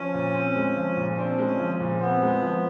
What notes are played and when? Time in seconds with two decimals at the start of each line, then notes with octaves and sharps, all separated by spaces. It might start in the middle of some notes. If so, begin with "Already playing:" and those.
Already playing: F3 C#4
0.14 A#2
0.35 C4
0.56 G#3
0.76 F3
0.97 A#2
1.18 C4 D4
1.39 G#3
1.46 C#4
1.59 F3
1.80 A#2
2.01 B3 C4
2.22 G#3
2.42 F3